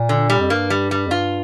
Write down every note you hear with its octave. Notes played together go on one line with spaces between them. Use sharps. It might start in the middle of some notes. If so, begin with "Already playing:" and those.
Already playing: A#2
D3
G3
F2
G2 A#3
G3
G3
F2
G2 F4